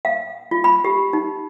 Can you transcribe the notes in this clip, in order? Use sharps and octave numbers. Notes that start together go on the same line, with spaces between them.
F5
F4
B5
G4
D#4